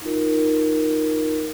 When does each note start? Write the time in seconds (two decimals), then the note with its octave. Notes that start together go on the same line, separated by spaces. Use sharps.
0.02 D#4 F4 A#4